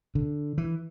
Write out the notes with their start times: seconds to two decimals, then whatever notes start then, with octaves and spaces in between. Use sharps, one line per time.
0.15 D3
0.58 E3